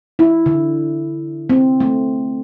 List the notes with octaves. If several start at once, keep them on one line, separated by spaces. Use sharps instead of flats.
E4
D3
C4
A3